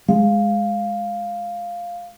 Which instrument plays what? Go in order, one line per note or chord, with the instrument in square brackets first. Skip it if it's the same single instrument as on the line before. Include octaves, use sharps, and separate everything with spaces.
[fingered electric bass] G#3 [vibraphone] F5